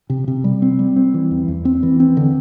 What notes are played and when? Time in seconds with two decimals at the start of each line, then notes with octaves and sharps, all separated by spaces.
0.10 C3
0.28 C3
0.44 G3
0.62 C4
0.79 G3
0.96 C4
1.14 E3
1.31 E2
1.48 E2
1.65 C4
1.83 E3
2.00 C4
2.17 D3